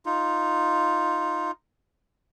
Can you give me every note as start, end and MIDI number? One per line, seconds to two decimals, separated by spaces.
0.06 1.51 63
0.06 1.51 65